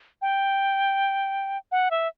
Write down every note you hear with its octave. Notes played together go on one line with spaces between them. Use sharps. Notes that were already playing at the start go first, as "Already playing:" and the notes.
G5
F#5
E5